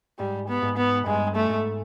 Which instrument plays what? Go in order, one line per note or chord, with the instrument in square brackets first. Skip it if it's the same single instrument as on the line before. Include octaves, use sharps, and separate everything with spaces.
[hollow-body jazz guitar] G#2 [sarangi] G3
[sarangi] B3
[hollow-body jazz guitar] G#2
[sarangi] B3
[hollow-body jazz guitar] G2 [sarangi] G#3
[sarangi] A3
[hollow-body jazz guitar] G#2